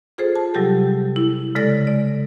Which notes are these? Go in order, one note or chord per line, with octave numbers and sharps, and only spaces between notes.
F4 G#4 A4 C5
A5
C3 F#3 G3 G4 A4
E4
C#3 G#3 A4 D5 A#6
D5